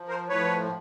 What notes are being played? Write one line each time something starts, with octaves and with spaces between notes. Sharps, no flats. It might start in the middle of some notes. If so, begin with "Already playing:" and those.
Already playing: F3
A#4 C5
A2 F3 B4 C#5